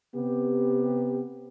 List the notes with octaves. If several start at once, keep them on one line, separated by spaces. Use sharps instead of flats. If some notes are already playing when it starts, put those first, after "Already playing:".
C3 B3 G4